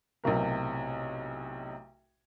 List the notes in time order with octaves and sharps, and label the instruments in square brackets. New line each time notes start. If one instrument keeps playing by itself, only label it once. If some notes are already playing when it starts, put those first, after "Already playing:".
[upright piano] B1 A2 C3 A#4